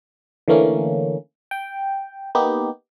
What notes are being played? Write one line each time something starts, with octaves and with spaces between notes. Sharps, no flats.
D3 E3 A3 A#3 C#4
G5
A#3 B3 D#4 G4